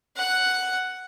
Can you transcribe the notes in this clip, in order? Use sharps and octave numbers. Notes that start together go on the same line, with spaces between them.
F#5 F#6